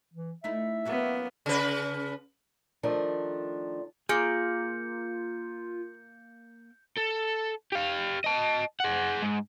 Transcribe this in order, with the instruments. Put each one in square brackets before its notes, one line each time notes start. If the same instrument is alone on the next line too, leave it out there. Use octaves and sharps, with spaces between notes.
[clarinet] E3
[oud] A3 D#4 E4 [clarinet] E5
[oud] F#3 C#4 F#4 [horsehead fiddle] A#3 B3
[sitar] C#3 B4
[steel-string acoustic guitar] D#3 F3 A3 D4 A#4
[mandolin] A#3 [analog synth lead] F4 [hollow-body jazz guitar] G#4 [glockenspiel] G6 C#7
[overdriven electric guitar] A4
G4 F5
D#5 A5
G#4 F#5
G#2